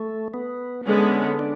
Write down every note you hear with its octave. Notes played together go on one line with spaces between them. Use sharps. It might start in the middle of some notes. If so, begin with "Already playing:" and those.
Already playing: A3
B3
D3 G#3 B3 C#4
D4